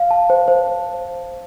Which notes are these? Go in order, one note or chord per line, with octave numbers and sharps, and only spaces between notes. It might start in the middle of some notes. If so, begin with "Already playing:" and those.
Already playing: F5
A5
C5
C5